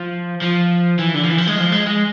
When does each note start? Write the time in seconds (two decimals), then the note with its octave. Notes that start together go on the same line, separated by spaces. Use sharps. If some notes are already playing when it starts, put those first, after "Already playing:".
Already playing: F3
0.41 F3
0.99 E3
1.14 D3
1.24 F3
1.28 E3
1.38 F3
1.47 G#3
1.58 F3
1.72 G#3
1.87 G#3